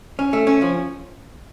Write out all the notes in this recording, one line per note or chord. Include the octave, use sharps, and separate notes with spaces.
C#4
A3
C#4
F3